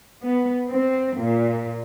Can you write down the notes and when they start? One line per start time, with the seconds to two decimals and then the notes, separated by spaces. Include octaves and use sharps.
0.23 B3
0.70 C4
1.18 A#2